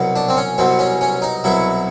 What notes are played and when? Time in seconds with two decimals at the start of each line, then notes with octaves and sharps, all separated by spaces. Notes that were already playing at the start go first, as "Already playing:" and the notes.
Already playing: C2 B2 F#3
0.16 D4
0.29 C4
0.37 C#4
0.58 C2 B2 F#3 C4
0.79 C#4
1.01 C#4
1.22 D#4
1.44 C2 B2 F#3 E4